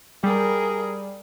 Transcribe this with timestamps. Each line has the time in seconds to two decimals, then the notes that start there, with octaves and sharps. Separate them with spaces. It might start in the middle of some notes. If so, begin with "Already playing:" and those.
0.24 G3 G#4 A#4